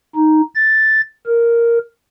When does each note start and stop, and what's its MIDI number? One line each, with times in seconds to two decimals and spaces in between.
0.15 0.41 63
0.55 1.01 93
1.26 1.78 70